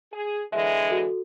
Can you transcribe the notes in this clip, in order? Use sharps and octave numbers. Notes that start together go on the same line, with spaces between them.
G#4
D3 E3 G#3 E5
F#4 A4